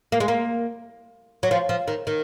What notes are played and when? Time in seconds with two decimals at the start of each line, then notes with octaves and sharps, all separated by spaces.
0.12 A#3
0.20 G#3
0.28 A#3
1.43 F#3
1.51 F3
1.69 F3
1.88 D#3
2.07 D#3